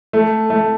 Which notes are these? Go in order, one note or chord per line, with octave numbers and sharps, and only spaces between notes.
A3
A3